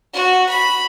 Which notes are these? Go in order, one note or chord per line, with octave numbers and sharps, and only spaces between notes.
F#4
B5